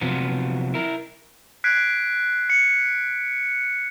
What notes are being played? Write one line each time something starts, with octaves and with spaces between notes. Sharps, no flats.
C3 F3 F#3 B3
E4 A#4
F#6 G#6 B6 C7 D7
C#7